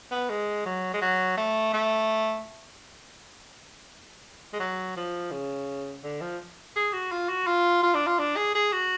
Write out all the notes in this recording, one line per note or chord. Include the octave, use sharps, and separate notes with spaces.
B3
G#3
F#3
G#3
F#3
A3
A3
G#3
F#3
F3
C#3
D3
F3
G#4
F#4
F4
F#4
F4
F4
D4
F4
D4
G#4
G#4
F#4